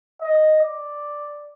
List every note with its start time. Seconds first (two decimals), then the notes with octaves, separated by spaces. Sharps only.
0.22 D#5
0.63 D5